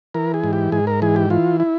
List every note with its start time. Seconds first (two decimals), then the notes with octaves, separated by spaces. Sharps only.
0.15 E3 A#4
0.34 G#4
0.44 G#2
0.53 G4
0.72 G#2 G#4
0.87 A#4
1.02 E3 G#4
1.16 G4
1.30 E3 F4
1.60 E4